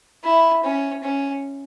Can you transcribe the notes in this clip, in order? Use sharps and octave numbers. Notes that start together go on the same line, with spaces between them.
E4
C#4
C#4